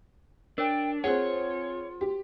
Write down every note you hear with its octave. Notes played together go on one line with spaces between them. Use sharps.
D4 A#4 C#5 G5
C4 F4 G#4 C5 C#5 F#5
F#4 G4